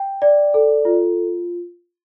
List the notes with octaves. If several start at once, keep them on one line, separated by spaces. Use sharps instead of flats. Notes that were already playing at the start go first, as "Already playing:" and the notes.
Already playing: G5
D5
A4
F4